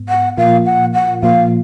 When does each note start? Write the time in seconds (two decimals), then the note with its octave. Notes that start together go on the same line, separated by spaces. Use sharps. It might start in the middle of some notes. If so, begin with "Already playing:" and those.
Already playing: G#2 B3
0.09 F#5
0.37 A#2 F3 A#3 F4 F5
0.66 F#5
0.94 F#5
1.22 A#2 F3 A#3 F4 F5